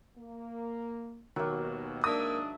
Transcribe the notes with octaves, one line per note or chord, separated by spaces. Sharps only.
A#3
D#2 B2 D#3 F#3 A#3
G#2 D#3 A#3 D4 E5 A#5 D#6